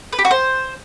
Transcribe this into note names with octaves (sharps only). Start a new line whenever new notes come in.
B4
G4
F#4
C5